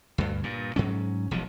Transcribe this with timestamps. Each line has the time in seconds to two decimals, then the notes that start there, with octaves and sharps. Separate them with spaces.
0.18 D2 G2
0.43 G2 A#2
0.76 G#2 F#3 C#4
1.31 E1 B1 C3 F3